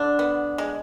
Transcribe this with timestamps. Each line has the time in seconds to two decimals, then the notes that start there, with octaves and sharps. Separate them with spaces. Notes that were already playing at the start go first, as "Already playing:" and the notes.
Already playing: D3 D4
0.19 B3
0.58 G#3